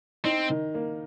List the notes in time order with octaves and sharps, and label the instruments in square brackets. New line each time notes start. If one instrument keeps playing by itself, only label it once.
[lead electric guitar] C4 [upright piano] D#4
[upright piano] D#3
A#3